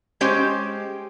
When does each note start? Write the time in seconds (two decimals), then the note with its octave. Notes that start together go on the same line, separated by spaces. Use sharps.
0.21 G#3 C#4 G4 C5